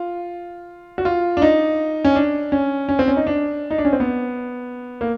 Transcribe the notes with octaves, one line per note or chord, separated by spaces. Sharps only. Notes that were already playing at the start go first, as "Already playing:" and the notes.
Already playing: F4
F#4
F4
D4
D#4
C#4
D4
C#4
C#4
C4
C#4
D#4
D4
D#4
D4
C#4
C4
B3
A#3